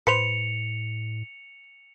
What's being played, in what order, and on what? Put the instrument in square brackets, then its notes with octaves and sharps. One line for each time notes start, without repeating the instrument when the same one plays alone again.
[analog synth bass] A2 [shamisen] B4 C5 [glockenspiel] C#7 F7